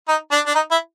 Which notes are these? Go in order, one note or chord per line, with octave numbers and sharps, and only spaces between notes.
D#4
D4
D4
D#4
E4